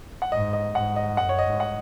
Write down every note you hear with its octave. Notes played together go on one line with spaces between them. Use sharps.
F#5
G#2 D#5
D#5
G#2 F#5
D#5
F#2 F#5
C#5
D#5
G#2
F#5